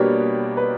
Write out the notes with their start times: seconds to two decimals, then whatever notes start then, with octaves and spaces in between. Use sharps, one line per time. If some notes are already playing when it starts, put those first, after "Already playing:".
Already playing: B2 G3 A#3 D4 G4 B4 C#5
0.57 B4